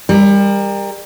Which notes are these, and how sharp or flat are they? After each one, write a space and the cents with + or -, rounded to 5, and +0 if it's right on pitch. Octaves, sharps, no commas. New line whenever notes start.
G3 +30 A#4 +0